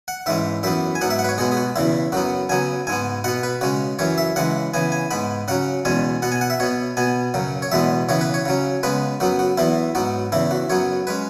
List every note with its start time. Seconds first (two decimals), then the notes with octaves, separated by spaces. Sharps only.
0.08 F#5
0.26 G#2 E3 G#3 C#4 E5
0.63 F#2 E3 B3 E5
0.95 G#5
1.01 G#2 F#3 B3 F#5
1.10 E5
1.19 F#5
1.24 B4
1.29 C#5
1.38 B2 G#3 B3 G#4
1.52 G#4
1.57 F#4
1.76 E2 C#3 E3 E4
2.12 F#2 F#3 B3 F#4
2.49 C#3 F#3 B3 G#5
2.87 G#2 G#3 B3 G#5
3.24 B2 B3 F#5
3.43 B4
3.61 C#3 G#3 C#4 F#4
3.99 F#2 E3 C#4 C#5
4.18 E5
4.36 C#3 E3 G#3 F#5
4.74 C#3 E3 B3 G#5
4.92 G#5
5.11 G#2 G#3 B3 B5
5.48 C#3 F#3 C#4 F#5
5.85 E2 B2 G#3 C#4 G#5
6.22 B2 B3 F#5
6.32 G#5
6.41 F#5
6.50 E5
6.60 B2 B3 C#5
6.97 B2 B3 G#5
7.34 F#2 C#3 F#3
7.62 C#5
7.71 E2 B2 G#3 B3 E5
8.09 C#3 E3 B3 C#5
8.21 B4
8.34 C#5
8.45 C#3 F#3 C#4
8.83 C#3 G#3 B3 B4
9.20 F#2 F#3 B3 F#4
9.39 F#4
9.57 E2 E3 B3 E4
9.95 G#2 F#3 B3 F#4
10.32 E2 C#3 E3 E4
10.51 F#4
10.70 F#2 F#3 B3 C#5
11.07 G#3 C#4 B4